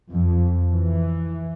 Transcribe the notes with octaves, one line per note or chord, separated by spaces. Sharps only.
F2
E3